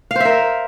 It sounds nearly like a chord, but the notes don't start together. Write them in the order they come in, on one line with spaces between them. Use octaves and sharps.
F5 C5 E5 A#4